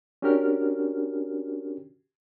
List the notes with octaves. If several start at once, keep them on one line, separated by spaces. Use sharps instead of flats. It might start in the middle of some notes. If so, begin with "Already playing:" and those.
C#4 D4 F#4 G4 A#4 F6